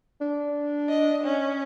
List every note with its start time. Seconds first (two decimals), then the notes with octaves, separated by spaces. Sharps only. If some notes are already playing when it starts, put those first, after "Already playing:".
0.21 D4
0.89 D#5
1.24 C#4